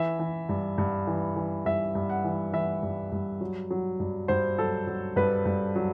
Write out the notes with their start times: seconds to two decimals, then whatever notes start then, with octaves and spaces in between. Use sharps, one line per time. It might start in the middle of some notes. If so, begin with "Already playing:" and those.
Already playing: E3 E5
0.19 E3
0.49 G2
0.78 G2
1.07 E3
1.36 E3
1.65 G2 E5
1.95 G2
2.10 F#5
2.24 E3
2.53 E3 E5
2.83 G2
3.12 G2
3.41 F#3
3.71 F#3
4.00 G2
4.28 G2 C5
4.58 F#3 A4
4.87 F#3
5.16 G2 B4
5.45 G2
5.76 F#3